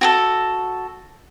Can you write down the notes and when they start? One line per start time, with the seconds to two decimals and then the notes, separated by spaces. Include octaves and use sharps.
0.01 F#4 G#4 A4